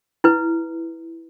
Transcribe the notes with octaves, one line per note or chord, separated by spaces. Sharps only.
E4 B4